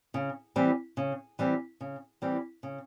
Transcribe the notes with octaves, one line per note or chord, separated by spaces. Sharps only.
C#3
E3 G3 C4
C#3
E3 G3 C4
C#3
E3 G3 C4
C#3